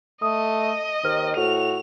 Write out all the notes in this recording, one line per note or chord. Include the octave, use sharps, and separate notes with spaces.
A3 D#5 D#6
D#2 D#3 C5 F6
A2 F#4 F7